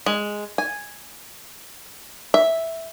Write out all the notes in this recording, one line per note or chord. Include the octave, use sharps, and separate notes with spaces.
G#3
G#5
E5